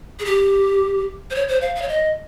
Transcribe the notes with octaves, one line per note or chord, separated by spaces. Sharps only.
G#4
G4
C5
C#5
C5
F5
F5
C#5
D#5